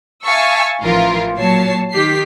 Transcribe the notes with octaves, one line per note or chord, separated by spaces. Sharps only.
E5 F5 G#5 A5 C#6 E6
A1 E3 F3 F4 A#4
A#2 F#3 C#5 A5 C7
D#3 G4 B6 C7